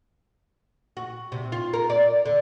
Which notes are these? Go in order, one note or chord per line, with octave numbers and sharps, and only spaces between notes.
F#4
C3
F4
A#4
D5
D3